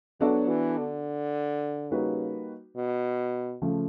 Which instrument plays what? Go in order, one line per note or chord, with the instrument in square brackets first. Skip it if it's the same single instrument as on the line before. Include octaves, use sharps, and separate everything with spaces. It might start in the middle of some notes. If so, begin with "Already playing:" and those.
[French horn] F#3 [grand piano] B3 D4 F#4 A4 D5
[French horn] E3
D3
[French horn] C#3 [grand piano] G3 A#3 D#4 F#4 B4
[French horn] B2
[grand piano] C#3 F3 A3